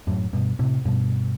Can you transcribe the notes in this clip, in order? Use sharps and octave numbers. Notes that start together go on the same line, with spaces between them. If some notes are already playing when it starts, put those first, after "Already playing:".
F#2 A2
G2 B2
A2 C3
G2 B2